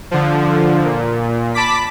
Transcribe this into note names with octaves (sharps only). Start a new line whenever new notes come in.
D3 F3
A#2
A5 B5 D6 B6